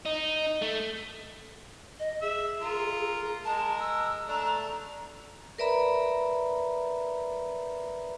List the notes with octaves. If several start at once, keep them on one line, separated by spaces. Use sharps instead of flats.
D#4
A3
D#5
G#4 E5
F4 A#4
G#3 A#4 A5
E6
A3 D4 A#5
A#4 B4 D5 E5 A#5 B5